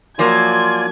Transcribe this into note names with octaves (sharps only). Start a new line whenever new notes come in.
F3 F#3 A#3 F4 D5 G#5 C6 G#6